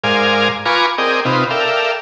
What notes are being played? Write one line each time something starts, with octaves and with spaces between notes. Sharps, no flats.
G#2 A#4 C5 D5 F5 G#5
F4 B4 G#5 A#5 C#6 D6
C4 G#4 A#4 D5 D#5 G5
C3 C4 D#4 F4 B4
A4 A#4 D5 E5 F5 G5